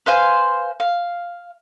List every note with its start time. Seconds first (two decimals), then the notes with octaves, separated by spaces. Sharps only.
0.06 B4 C5 F5 G#5
0.80 F5